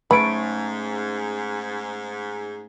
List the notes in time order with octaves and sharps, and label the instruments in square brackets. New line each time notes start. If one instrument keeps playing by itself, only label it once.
[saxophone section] G#2 [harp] A3 C#4 D7 [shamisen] B4